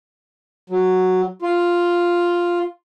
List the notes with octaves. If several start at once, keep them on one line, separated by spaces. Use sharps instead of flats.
F#3
F4